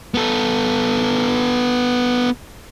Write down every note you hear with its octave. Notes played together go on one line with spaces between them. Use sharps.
B3 A4